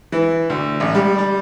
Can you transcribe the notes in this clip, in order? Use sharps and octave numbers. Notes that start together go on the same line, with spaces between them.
E3
D2
A1
G3
G3